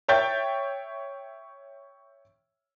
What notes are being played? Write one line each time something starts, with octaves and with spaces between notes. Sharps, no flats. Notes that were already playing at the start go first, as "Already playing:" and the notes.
C#5 E5 G5 G6 A6